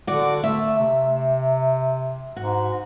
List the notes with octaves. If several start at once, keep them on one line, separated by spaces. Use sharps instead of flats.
D3 F#4 D5
A3 E5
C3
G#2 F#4